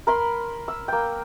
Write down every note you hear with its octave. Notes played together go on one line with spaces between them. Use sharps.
A#4 B5 C6
E6
A#3 G5